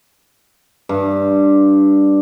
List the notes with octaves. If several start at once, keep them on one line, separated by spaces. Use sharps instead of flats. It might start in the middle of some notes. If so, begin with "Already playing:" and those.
G2